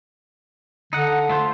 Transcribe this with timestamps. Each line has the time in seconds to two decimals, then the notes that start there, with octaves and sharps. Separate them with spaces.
0.93 D3 D#4 F#5
1.29 A3 F4 C5